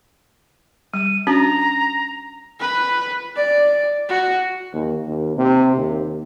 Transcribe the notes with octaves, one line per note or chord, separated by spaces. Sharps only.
G3 D#7
C#4 D4 F#4 A#5
B4
D5
F#4
D#2
D#2
C3
D#2